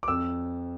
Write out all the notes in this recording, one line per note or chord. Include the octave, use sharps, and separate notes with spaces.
D6
F2 E6